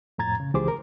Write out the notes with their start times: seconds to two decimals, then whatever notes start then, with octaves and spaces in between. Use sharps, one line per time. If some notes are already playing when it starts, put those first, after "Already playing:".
0.18 F2 A2 A#5 G#6 A6
0.40 C#3
0.54 C#2 E3 G4 G#4 C5 D6
0.68 A#4